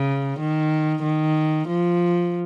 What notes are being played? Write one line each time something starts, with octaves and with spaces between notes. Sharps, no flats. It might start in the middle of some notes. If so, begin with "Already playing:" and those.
Already playing: C#3
D#3
D#3
F3